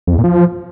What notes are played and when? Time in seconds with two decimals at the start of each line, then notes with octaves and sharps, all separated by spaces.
0.07 F2
0.13 E2
0.18 A#2
0.24 F3